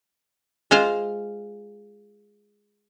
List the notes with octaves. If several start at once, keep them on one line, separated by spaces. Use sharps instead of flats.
G#3 F4 C5 F5